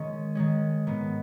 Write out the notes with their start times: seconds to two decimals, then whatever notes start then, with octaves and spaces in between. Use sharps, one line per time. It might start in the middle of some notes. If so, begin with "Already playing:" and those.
Already playing: D#3 G#3 C#4
0.35 D#3 G#3 C#4
0.87 G#2 D#3 B3